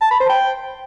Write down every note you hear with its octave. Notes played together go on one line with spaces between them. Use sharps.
A5
B5
C5
G5